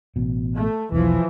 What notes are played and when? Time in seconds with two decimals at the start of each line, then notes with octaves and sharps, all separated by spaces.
0.16 A1 B2
0.55 A3
0.92 E1 B1 E3 F3